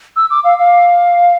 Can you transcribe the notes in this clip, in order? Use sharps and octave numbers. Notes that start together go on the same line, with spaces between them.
E6
D6
F5
F5